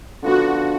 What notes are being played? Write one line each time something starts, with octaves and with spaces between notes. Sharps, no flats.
D3 F3 B3 D4 F#4